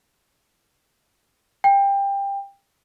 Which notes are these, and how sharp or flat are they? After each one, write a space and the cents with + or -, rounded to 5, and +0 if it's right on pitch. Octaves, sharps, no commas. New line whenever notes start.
G5 +20